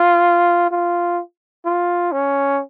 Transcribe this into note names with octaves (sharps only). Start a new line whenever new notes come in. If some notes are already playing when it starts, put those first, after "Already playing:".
Already playing: F4
F4
F4
C#4